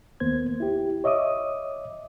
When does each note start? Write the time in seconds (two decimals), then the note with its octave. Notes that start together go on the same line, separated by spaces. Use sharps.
0.20 D#2 A#3 B3 C5 G#6
0.60 E4 G4
1.04 C#5 D#5 E5 D6 D#6